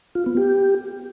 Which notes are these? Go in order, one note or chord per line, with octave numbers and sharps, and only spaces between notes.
F4
B3
G4